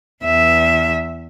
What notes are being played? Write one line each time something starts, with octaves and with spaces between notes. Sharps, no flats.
E2 E5